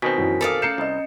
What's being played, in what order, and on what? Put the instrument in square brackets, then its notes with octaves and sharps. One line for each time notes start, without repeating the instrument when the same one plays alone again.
[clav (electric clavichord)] B2 D#3 C4 [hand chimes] G#5 B6
[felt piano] F#2 E3 F#3
[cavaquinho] A4 D5 F5 [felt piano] A#4 D#6
[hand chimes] C#4 A#5 G6 [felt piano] C7 C#7 E7
[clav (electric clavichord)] C2 [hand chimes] C#4 D#5